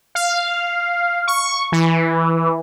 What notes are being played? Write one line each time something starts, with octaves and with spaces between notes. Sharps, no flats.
F5
C#6
E3